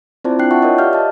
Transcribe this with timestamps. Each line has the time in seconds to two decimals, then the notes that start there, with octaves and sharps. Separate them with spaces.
0.24 C4 E4 F4 C5 D5 A5
0.39 D4 E4 G5 F#6 C7
0.51 F4 E5 F#5 G5 A5 C#6
0.62 A#4 C#5 D#5
0.78 G4 D5 E5 F5 F6 G6
0.93 D#5 A5